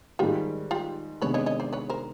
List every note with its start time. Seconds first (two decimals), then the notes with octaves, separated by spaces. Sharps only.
0.19 G#2 D#3 G3 F4 G4
0.71 F4 G4
1.22 C3 D#3 G#3 B3 D4 B4 C#5
1.34 C#5 D#5
1.46 C#5 D#5
1.60 C5 D5
1.73 B4 C#5
1.90 A#4 C5